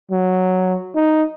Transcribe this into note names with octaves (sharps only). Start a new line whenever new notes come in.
F#3
D#4